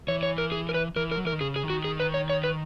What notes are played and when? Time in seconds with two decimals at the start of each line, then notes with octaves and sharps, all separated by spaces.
0.08 E3 C#5
0.23 C#5
0.38 A#4
0.52 G#4
0.69 A#4
0.74 B4
0.96 E3 A#4
1.11 A#4
1.17 F#3
1.25 E3 A#4
1.32 D#3
1.41 C#3 G#4
1.56 G#4
1.63 D#3
1.70 F#4
1.85 G#4
2.00 B4
2.14 C#5
2.29 C#5
2.44 B4